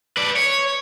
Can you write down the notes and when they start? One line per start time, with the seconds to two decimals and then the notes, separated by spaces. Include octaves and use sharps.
0.17 B4 D5
0.36 C#5